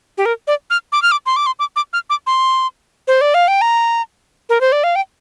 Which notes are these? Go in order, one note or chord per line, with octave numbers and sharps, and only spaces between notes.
G4
A#4
D5
F6
D6
F6
D6
C6
D6
C6
D6
D6
F6
D6
C6
C5
D5
F5
G5
A#5
A#4
C5
D5
F5
G5